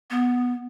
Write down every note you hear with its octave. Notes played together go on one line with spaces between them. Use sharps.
B3